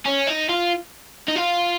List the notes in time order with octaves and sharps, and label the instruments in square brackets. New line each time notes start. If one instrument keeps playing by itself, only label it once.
[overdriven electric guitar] C#4
D#4
F4
D#4
F4